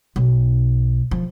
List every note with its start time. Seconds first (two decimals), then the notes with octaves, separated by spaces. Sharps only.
0.16 B1
1.11 F3